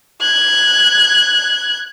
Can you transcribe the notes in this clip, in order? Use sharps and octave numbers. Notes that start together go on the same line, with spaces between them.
F#6 G#6